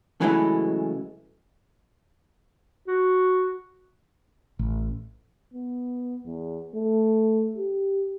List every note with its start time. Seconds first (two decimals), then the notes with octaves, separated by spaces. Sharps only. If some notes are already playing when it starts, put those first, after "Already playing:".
0.21 C#3 E3 F#3 G#3 A3 E4
2.88 F#4
4.59 A1
5.54 B3
6.26 E2
6.75 A3
7.57 G4